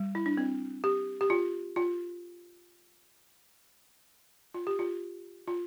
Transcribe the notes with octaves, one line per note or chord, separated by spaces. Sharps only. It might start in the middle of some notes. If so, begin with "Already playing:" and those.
Already playing: G3
E4
D4
C4
G4
G4
F4
F4
F4
G4
F4
F4